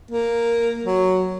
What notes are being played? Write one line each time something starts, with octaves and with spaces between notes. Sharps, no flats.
A#3
F#3